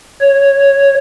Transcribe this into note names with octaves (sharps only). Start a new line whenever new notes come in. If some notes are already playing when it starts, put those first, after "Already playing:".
C#5